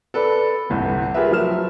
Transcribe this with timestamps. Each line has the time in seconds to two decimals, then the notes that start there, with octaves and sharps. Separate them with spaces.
0.14 A4 B4 D5 B5
0.70 G1 C2
1.14 F4 G4 G#4 A#4 B4 E5
1.31 F3 F#3 E5 F6 E7